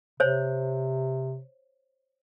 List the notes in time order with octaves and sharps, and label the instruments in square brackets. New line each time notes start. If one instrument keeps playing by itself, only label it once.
[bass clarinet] C3 [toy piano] C5 C#5